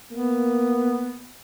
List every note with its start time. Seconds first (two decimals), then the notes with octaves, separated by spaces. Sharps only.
0.12 A#3 B3